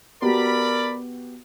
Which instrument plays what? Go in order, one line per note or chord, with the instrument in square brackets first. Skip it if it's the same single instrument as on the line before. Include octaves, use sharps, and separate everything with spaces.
[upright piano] B3 F#4 G4 [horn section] A#4 D5 B5